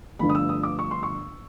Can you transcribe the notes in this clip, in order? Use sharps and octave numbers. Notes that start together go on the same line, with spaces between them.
G1 G2 D3 F3 A3 B5
D#6
E6
D#6
D6
C#6
C6
C#6